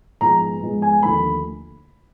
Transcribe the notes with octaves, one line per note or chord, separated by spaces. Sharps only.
G#2 F3 G#3 B3 A#5
G#2 F3 G#3 B3
G#5
D#2 D3 F3 A3 B5